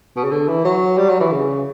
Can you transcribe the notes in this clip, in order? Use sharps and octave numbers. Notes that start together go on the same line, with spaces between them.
B2
C#3
D3
E3
F#3
G3
F#3
E3
C#3